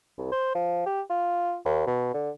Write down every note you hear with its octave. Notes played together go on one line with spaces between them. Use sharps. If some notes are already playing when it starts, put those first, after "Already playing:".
C2
C5
F3
G4
F4
D#2
B2
D3